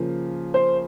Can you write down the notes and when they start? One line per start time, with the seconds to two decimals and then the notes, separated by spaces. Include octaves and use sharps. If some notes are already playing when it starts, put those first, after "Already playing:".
Already playing: C#3 F3 A#3
0.54 C5